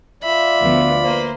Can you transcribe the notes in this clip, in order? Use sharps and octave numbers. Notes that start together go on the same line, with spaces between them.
F4 D5 E5 B5
D2 F3 B3
A#3 B4 C5